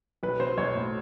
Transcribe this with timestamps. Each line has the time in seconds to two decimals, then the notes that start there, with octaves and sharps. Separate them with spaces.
0.23 B1 B4
0.40 F#3 C5
0.57 B1 C#5
0.75 A2